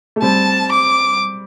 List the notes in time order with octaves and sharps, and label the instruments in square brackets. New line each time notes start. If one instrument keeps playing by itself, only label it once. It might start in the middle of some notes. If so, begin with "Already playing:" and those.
[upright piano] A3
[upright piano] G3 C4 [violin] A5
[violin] D6